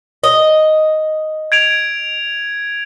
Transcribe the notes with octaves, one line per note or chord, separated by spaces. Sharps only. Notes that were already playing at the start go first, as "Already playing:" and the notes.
D#5
G#6 D7 F7